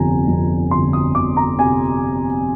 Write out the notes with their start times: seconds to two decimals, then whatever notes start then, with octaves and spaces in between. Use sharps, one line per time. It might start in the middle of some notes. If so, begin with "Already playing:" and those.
Already playing: G1 F2 C3 G#5 A#5
0.28 F2
0.71 G1 C6
0.93 D#6
1.15 G1 D6
1.37 A#5
1.59 C3 G#5